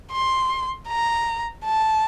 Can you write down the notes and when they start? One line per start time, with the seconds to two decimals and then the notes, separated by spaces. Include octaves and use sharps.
0.12 C6
0.88 A#5
1.65 A5